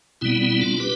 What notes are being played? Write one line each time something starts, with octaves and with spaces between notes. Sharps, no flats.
B2 G3 B3 C4 E4
C4 E4
D4 F4
G4 B4